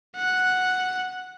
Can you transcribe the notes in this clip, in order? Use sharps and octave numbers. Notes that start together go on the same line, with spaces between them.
F#5